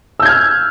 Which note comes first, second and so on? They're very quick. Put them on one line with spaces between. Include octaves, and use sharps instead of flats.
E6 G6 G#6 F6